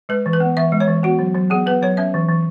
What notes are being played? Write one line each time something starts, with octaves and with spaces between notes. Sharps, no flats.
G#3 B4
E3
B4
B3
E3 E5
G#3
C#5
E3
B3 F#4
F#3
F#3
B3 G#4
B3 B4
F#3 C#5
C#4 E5
E3
E3